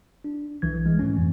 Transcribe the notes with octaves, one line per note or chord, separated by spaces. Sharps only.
D4
B1 E3 G#6
G#3
G#2 E3 A3 C#4
F2 C4